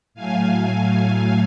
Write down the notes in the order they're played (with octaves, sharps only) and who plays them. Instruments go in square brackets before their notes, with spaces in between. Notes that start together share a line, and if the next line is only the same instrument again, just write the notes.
[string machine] A2 F#3 A3 F5 G#5
F5 G#5